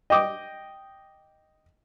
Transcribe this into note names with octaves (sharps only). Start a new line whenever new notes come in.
D#5 G5 D6 D#6